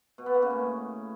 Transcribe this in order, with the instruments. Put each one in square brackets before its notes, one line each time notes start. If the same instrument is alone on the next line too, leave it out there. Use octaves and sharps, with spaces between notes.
[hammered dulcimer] B2
B3
A#3
C#3
A2